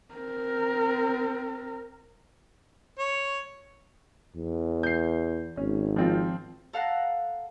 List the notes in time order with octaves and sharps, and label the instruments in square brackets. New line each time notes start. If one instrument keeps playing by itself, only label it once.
[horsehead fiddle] C4 A#4
[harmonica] C#5
[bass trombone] E2
[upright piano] G6 C7
[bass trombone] G#1 [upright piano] C#4
[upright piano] F3 C4 F4
[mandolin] A4 F5 F#5 A#5